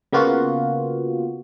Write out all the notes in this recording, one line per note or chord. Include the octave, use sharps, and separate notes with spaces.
C#3 A#3 B3 F4 F#4